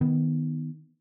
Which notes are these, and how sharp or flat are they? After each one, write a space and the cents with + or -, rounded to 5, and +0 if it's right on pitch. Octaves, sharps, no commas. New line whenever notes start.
D#3 +0 B3 +0